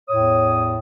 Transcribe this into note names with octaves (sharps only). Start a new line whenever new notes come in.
E2 A2 C#5 D#6